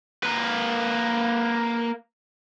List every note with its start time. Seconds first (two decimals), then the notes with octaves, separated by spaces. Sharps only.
0.23 A#3 B4